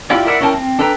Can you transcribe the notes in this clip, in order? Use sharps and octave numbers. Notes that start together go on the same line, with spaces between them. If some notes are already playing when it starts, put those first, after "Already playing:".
E4 F4 G4 D5
E4 A#4 D5 E5 F#5
C#4 E4 A#4 G5 A5
C4
D4 A4 B4 G5 A#5